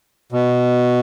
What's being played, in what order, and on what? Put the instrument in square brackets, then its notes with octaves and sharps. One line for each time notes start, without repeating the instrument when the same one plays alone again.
[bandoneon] B2